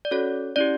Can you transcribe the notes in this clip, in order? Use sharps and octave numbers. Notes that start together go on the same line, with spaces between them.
D5
C#4 F#4 A4 C#5
C#4 E4 G4 D5